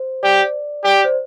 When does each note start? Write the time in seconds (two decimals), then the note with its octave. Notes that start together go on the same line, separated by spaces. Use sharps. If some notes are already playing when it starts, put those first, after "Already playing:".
Already playing: C5
0.23 G4 D5
0.84 G4 D5
1.04 C5